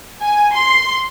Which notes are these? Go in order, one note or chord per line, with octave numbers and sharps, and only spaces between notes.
G#5
C6